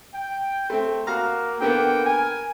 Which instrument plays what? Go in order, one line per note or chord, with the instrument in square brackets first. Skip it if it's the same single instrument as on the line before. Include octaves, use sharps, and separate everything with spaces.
[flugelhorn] G5
[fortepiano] A3 C4
[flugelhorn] A#3 [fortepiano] F#4 F5 A#5
[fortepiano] D3 A#3 B3 [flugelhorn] G5
[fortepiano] A#4 [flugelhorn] G#5